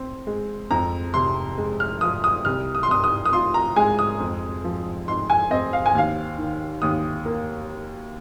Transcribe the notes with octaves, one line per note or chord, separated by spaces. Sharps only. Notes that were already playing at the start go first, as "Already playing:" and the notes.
Already playing: C4
G#3
F2 A#5
C3 C6
G#3
F6
F3 D#6
D#6
C2 F6
D#6
C6
C3 D#6
D#6
D#6
F4 C6
A#5
G#3 G#5
D#6
F2
F3
D#4 C6
G#5
C4 D#5
F5
G#5
D#2 F5
D#3
D#2 D#6
A#3